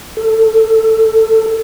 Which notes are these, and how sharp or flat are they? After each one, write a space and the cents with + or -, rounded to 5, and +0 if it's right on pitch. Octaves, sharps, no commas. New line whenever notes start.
A4 +15